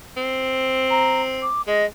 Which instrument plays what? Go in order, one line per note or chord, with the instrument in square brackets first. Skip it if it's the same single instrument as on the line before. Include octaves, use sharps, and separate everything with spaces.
[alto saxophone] C4
[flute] A#5
D6
[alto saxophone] G#3 [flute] D#5